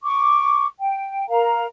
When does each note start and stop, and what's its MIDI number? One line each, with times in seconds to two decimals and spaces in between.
0.03 0.66 85
0.03 0.66 86
0.79 1.27 79
1.29 1.66 70
1.29 1.66 77
1.29 1.66 82